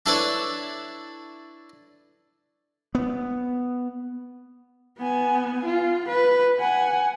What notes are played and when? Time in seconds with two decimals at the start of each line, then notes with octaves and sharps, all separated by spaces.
0.06 D4 E4 A4 B4 C#5 D5
2.95 B3
4.98 B3 G#5
5.65 F4
6.09 B4
6.60 F#5 G#5